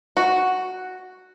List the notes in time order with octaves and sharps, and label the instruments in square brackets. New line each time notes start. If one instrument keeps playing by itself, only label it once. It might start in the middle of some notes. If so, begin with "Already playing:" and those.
[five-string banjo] F#4